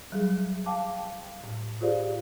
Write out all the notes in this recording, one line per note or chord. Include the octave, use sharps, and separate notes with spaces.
F#3 G3 G#4
F5 G5 A5 D6
A2
F4 G4 G#4 C5 D5 F5